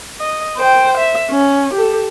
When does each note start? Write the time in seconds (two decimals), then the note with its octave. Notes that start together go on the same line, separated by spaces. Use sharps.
0.20 D#5
0.58 C5 G5
0.97 E5
1.31 C#4
1.74 G4 A4